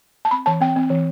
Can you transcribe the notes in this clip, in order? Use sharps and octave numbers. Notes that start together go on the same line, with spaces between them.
A5
C4 B5
E3 A5
C4 G5
C4
E3